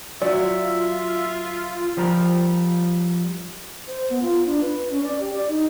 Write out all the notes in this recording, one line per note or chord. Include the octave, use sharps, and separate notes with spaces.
F#3 F4 D5 E5
F3 G3 A#4
C5
B3
F4
D4
B4
C#4
D5
G4
D5
D#4